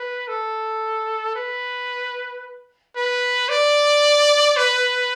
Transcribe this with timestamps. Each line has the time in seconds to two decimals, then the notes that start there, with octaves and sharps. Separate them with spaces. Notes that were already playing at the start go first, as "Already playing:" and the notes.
Already playing: B4
0.28 A4
1.36 B4
2.96 B4
3.49 D5
4.56 B4